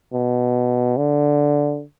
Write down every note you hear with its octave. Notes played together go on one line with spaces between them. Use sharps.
B2
D3